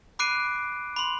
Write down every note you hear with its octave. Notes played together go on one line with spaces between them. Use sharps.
B5 D6 F#6 C7 D7 D#7
B5 C6